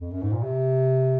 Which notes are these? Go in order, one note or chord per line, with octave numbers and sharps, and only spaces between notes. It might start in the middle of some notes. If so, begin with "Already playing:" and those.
F2
F#2
G#2
A#2
C3